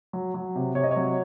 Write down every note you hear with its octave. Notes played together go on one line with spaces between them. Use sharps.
F#3
F#3
C3
C3 C#5
D#5
C#5
F#3